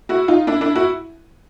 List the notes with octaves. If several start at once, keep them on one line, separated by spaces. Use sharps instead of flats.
E4 F#4
D#4 F4
D4 E4
D4 E4
E4 F#4